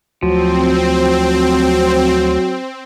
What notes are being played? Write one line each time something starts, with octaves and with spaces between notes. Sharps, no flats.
D2 F3 F#3 C4